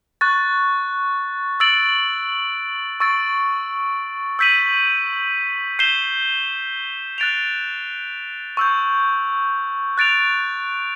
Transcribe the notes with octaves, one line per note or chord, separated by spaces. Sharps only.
C#6 F#6 A6
E6 A6 D7 F#7
C#6 E6 A6 D7
E6 G6 B6 D#7 F#7
G6 C7 E7 G7
F#6 A6 D7 F7
C#6 E6 G6
F#6 A6 D7 F7